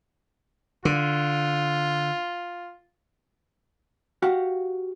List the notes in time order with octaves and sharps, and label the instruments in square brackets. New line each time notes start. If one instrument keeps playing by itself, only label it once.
[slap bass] D3 [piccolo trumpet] F4
[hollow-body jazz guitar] F#4 G4 F5 F#5